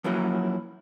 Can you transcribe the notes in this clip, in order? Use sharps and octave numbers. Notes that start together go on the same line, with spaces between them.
F3 F#3 A#3 C#4 E4 F#4